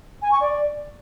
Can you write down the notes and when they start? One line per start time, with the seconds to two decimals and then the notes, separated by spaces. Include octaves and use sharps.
0.22 G#5
0.31 C#6
0.41 D5